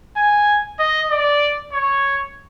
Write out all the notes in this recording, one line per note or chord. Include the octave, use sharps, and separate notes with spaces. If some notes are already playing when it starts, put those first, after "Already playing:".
G#5
D#5
D5
C#5